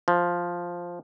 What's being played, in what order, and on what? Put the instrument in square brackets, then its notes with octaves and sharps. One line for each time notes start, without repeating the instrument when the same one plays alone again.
[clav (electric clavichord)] F3